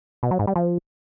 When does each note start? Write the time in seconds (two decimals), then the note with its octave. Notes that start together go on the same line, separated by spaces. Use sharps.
0.23 B2
0.31 F#3
0.39 G#2
0.47 G3
0.56 F3